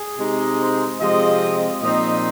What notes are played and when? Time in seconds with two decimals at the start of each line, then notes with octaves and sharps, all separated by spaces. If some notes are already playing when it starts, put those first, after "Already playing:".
Already playing: G#4
0.18 C3 G#3 D#4
0.60 C5
1.01 C3 F3 G#3 C4 D#5
1.82 A#2 F3 C4 D#4 D#5